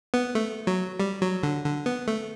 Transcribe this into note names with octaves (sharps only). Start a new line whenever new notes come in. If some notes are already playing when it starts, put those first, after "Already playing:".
B3
A3
F#3
G3
F#3
D3
D3
B3
A3